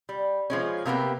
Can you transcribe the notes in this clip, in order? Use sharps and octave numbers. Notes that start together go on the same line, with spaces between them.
G3
F3 G#3 C#4
C3 A#3 B3 G4